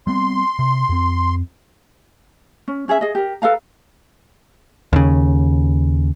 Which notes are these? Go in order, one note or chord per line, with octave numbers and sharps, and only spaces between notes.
G3 B3 C4 C6
C3
F2 C4
C#4
C#4 G#4 A4 E5
G#4 D#5
G4 A#4
A4 B4 F5 A#5
D#2 C#3